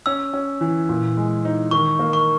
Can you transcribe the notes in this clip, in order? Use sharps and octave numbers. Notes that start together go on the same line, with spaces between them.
C#4 E6
C#4
E3
A#2
G#3
D#4
D#3 C#6
A#3
C#6